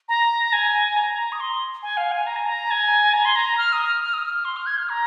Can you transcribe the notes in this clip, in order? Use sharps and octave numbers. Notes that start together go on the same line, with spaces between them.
A#5
G#5
A#5
D#6
C6
G#5
F5
G#5
A#5
G#5
A#5
G#5
A#5
C6
A#5
F6
D#6
F6
F6
D#6
F6
C6
F6
G#6
F6
A#5